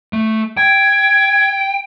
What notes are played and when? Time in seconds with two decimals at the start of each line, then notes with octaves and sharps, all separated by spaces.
0.13 A3
0.57 G5 G#6